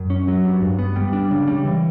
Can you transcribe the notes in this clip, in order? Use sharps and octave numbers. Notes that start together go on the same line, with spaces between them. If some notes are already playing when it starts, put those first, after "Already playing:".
Already playing: F#2
C#4
F#3
G2
G2
B3
G3
D4
C#3
G3
E3